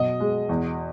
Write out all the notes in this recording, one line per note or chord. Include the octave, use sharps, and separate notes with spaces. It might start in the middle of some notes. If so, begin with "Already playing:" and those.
Already playing: B2 F#3 D#5
G#3
E2